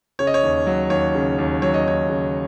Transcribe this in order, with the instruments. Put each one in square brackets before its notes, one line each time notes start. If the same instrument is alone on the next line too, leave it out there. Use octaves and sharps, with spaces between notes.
[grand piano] C#3 C#5
D#5
C#5
D#2
F#3
D#2 C#5
C#3
D#2
F#3 C#5
D#5
D#2 C#5
C#3